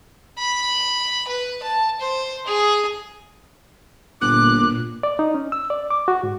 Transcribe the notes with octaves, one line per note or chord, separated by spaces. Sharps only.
B5
B4
A5
C5
G#4
G1 A#2 D6 F#6
D5
D#4
C#4
E6
D5
D6
F#4
G#2